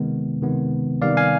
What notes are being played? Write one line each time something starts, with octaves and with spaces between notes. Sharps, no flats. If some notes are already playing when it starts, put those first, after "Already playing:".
Already playing: C3 D#3 G#3 B3
C3 D#3 G#3 B3
C3 D#3 G3 B3 D5 F5
F5 G#5